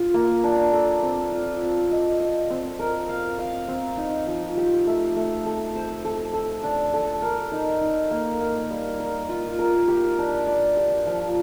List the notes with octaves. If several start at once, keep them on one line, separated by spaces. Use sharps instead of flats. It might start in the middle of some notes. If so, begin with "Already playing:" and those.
Already playing: F4
A#3
D4
A4
C4
F4
C4
D#5
D#5
C4
A#4
F5
F5
C4
D#4
F3
G4
A3
A3
A4
C5
A4
A4
D4
A4
A#4
D#4
D#4
A#3
A#3
G3
A#4
F4
A#4
G4
D4
D5
G4
F3